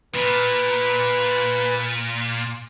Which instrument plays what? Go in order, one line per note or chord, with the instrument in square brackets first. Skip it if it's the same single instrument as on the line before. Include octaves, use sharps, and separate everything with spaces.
[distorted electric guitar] A#2 [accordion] B4